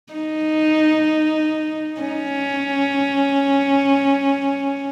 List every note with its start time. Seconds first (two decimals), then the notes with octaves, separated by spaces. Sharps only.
0.13 D#4
2.01 C#4